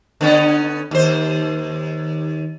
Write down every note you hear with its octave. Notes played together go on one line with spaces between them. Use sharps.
D3 B3 C#4
D#2 C5